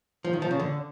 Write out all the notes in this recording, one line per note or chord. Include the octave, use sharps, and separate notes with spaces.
F3
D#3
F3
C#3
D3